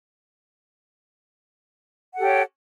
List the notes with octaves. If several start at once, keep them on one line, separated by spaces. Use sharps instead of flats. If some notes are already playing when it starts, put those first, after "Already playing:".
G4 A4 C#5 F#5